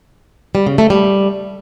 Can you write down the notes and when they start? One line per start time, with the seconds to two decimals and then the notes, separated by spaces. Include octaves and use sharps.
0.55 G3
0.67 C#3
0.78 A3
0.90 G3